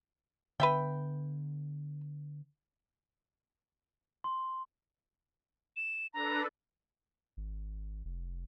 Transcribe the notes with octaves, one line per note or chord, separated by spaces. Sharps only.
D3 B3 B4 E5 G5
C6
E7
D4 A4 B4 A#5
G#1
F1